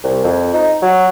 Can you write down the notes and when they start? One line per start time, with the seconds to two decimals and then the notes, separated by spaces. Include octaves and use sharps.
0.04 C2
0.24 F2
0.54 D#4
0.82 F#3